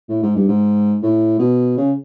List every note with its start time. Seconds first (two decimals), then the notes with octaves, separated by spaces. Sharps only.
0.09 A2
0.22 G#2
0.36 G2
0.48 G#2
1.02 A2
1.39 B2
1.77 C#3